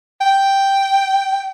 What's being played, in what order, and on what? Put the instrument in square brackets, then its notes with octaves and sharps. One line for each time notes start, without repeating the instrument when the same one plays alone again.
[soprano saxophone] G5